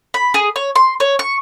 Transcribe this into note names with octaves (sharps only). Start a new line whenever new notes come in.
B5
G#4
C#5
C6
C#5
C#6